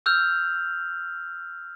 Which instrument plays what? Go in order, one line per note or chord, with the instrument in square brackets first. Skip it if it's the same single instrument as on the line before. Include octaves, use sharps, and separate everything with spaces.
[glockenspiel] E6 F6 G6 F7